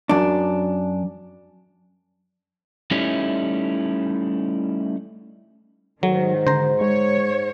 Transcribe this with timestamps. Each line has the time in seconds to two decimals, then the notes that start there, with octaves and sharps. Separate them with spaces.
0.09 F#2 D4
2.91 G3 A3 C#4 D#4 E4
6.03 G#2 D#3 F#3 A3
6.47 D3 C5 A#5
6.81 G#3 C#5